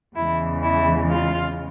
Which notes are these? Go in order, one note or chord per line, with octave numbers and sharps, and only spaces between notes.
E2 C#3 E3 G#3 E4
E4
F4